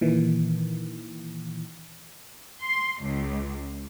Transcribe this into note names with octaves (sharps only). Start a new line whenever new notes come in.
A#2 D#3 E3
C6
C#2